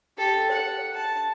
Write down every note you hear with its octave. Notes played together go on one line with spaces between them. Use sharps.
G4 A4
F#5
A5